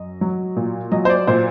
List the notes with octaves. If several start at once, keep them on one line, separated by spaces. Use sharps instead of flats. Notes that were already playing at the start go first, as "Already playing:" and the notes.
Already playing: F#2 D#5
F#3
A#2
F#3 D#5
C5
D5
A#2 C5